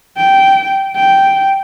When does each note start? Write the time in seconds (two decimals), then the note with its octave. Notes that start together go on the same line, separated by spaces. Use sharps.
0.17 G5
0.96 G5